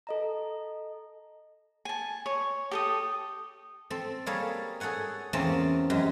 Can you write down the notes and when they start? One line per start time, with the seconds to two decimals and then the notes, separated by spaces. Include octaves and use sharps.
0.07 A4 D#5 A#5
1.85 G#5 A5
2.26 C#5
2.71 G4 A4 D#6
3.90 C4 A4
4.26 G3 A#3 G#4 A4 C#5 F5
4.80 G#4 A4 C#5 F#5 G#5
5.33 E2 A#3 C4 C#4 A5
5.90 F#2 G#3 G4